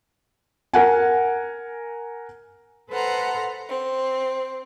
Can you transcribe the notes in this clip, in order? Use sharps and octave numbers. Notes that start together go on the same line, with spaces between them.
A#4 F#5 G#5
A4 B4 C5 F#5 A#5 C6
C4